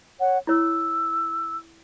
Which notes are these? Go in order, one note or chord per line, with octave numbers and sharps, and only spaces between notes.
C#5 F#5
E4 C#5 E6